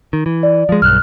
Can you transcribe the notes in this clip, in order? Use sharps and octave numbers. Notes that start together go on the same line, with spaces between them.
D#3
E3
D5
F3 G#3
B1 G2 F6 F#6